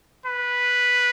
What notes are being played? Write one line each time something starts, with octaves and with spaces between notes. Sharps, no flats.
B4